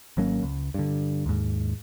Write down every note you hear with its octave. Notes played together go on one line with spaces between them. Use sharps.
G#1 F#3 A#3 C#4
C#2
G2 D3
D#2 G#2